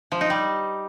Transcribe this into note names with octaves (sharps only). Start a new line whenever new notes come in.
F3
D#4
G3